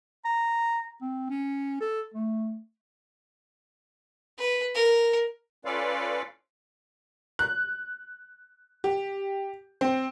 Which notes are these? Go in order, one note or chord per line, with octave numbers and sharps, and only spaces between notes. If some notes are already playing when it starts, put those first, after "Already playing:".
A#5
C4
C#4
A4
A3
B4
A#4
C#4 F4 A4 B4 D5 F5
F#6
G4
C4